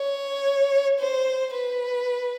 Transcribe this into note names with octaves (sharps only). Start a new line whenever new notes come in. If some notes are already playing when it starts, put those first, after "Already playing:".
Already playing: C#5
C5
B4